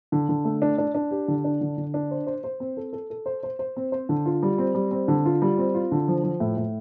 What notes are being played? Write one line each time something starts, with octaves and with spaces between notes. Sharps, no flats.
D3
D3
A3
D4
D4
D4
G4
D3
D4
D3
D3
D4
C5
C5
C5
C4
A4
A4
A4
C5
C5
C5
C4
C5
D3
F4
G3
C4
G3
C4
D3
F4
G3
C4
F4
D3
F3
F3
A2
A2